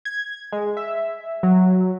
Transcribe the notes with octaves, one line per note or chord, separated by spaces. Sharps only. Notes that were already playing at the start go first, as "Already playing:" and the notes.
G#6
G#3
E5
F#3